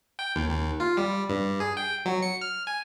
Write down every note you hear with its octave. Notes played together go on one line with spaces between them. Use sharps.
G5
D#2
D#2
F4
G3
G2
G#4
G5
F#3
C#7
F6
G#5